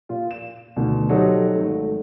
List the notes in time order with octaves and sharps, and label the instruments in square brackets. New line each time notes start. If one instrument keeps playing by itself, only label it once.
[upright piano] A#2 F4
E7
D2 B2 D#3
F#3 D#4 G4 A4 C5 C#5
G#1 A3